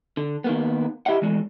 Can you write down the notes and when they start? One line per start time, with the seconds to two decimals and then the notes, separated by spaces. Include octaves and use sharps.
0.17 D3
0.44 D#3 A#3 B3
1.06 E4 G4 D#5 E5 F#5
1.22 E3 G#3 A3